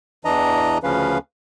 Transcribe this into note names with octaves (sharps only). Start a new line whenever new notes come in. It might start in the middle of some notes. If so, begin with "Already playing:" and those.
E2 E3 D4 D#5 A#5
D2 C#3 F3 C#4 B4 F5